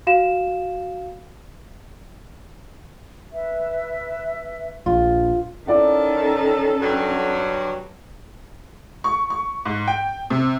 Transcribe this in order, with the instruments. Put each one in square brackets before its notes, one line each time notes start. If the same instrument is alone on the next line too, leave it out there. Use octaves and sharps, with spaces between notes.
[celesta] F#4 F5 E7
[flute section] B4 E5
[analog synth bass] A#1 [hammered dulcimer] F4
[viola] D#3 A4 [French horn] C#4 [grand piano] E4 D5 F#5
[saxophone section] G2 F#3
[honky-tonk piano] C#6
C#6
G#2
G5
C3